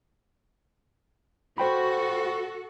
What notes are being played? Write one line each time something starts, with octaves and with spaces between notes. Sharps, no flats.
F#4 A4 C5 G5 B5